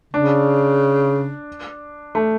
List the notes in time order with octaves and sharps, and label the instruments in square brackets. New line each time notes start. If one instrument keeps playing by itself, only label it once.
[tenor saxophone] C#3 [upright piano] D4
[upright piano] A3